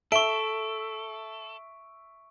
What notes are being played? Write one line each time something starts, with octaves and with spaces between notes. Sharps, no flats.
A4 E5 C#6 D7